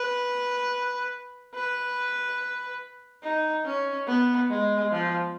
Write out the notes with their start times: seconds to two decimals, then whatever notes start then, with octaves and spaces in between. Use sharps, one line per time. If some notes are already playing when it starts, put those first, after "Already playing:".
Already playing: B4
1.55 B4
3.23 D#4
3.65 C#4
4.07 B3
4.50 G#3
4.92 F3